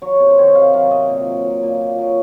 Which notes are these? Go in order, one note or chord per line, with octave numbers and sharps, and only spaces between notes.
F#3 C#5
C3
C5
D#3 C#5
D#5
C3 F5
F#3 F5
C3 D#5
A#2
F#3
F#3
A#2
A#2
F#3